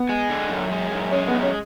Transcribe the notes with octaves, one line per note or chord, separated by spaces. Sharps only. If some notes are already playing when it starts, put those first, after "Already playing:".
Already playing: B3
G#3
D3
F#2
G#3
F#2
G#3 C#4
B3
F#2
C#4